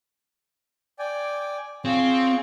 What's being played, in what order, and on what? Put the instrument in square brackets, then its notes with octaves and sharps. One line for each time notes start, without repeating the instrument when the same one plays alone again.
[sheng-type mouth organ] D5 G5 G#5
[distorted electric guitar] C4 [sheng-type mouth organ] F4 G#4 C#5